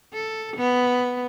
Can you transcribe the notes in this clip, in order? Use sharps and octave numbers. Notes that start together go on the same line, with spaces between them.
A4
B3